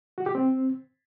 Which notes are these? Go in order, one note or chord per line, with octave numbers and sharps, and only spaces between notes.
F#4
G4
C4